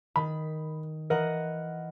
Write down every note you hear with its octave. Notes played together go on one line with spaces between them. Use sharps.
D#3 B5
E3 A#4 D#5 F#5